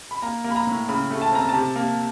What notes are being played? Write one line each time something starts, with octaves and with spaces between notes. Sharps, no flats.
B5
A#3 A#5
A#3
B5
A#5
A2
C#3 B5
A3
A5
C4 A#5
A5
C3
A#3